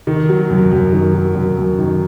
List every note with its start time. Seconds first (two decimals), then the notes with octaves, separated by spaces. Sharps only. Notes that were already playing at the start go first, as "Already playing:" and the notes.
0.07 D#3
0.29 F#3
0.50 F#2
0.72 F#2
0.93 D#3
1.14 F#3
1.35 F#2
1.57 F#2
1.78 D#3